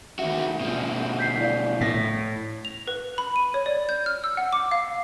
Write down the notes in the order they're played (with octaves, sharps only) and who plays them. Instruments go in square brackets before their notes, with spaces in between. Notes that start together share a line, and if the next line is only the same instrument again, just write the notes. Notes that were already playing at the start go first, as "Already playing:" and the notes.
[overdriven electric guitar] D#2 F#4 [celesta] E5
[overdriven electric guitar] B2 F3
[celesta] G6 B6 C7
E4 D5 F5
[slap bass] A2 [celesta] B6
[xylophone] F7
B4
B5
D#7
C#5
D5
G6
F6
E6
F#5
D6
F5